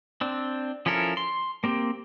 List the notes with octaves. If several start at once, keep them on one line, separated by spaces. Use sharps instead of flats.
C4 D4
F3 C#4 E4 A4 A#4
C6
A#3 C4 G4